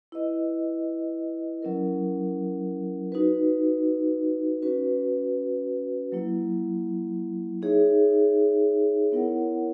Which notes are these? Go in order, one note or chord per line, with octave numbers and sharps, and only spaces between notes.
E4 B4 D#5
F#3 C#4 E4 A#4
D#4 F#4 B4
C#4 F#4 B4
F#3 A#3 E4
D#4 G#4 C#5 E5
B3 E4 A#4 C#5 F#5